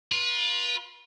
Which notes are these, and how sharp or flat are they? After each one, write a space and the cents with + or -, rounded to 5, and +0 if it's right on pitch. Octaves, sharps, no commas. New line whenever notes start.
F4 +10 B4 -30